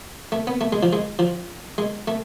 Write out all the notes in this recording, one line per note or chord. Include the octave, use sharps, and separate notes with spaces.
A3
B3
A3
G#3
F3
G#3
F3
G#3
A3